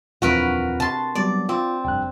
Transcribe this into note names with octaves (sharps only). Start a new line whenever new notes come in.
D#1 F2 E3 C4 F4 F#4 A#4 B4
C3 A5 C6
F#3 G3 B3 D5
C4 F4
F1 G2 G5 F#6